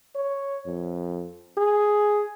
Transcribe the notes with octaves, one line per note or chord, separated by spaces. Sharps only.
C#5
F2
G#4